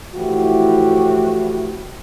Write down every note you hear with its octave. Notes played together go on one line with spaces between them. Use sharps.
A2 E3 F3 E4 F#4 G4